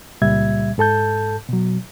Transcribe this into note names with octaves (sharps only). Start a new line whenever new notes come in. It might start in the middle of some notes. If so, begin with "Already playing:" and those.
C#2 A#2 G3 E5 G#6
G#2 A4 A5 G6
B2 F#3